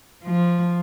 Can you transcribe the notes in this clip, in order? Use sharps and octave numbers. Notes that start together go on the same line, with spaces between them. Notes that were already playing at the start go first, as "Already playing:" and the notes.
F3